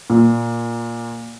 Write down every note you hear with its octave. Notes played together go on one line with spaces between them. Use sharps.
A#2